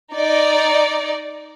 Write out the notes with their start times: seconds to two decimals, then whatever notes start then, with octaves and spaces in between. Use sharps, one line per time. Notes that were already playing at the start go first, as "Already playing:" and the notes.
0.14 D#4 D5